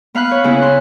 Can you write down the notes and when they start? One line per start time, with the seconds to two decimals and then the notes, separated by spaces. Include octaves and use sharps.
0.15 B3 F5 B5 F#6
0.31 C#5
0.44 C#3 B3 C#4 E4
0.61 E4 C6 F#6